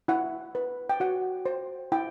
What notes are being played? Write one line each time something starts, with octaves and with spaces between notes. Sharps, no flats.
E4 F#5
B4
G5
F#4 F#5
C5
E4 G5